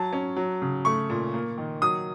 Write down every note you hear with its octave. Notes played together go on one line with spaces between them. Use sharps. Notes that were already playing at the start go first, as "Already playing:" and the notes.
Already playing: F#3 A5
C#4
F#3
C#3
A3 C#6
A#2
A#3
D#3
F#3 D#6